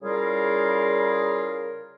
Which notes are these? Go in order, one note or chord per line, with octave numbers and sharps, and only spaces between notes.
C#3 G3 E4 F4 G#4 A#4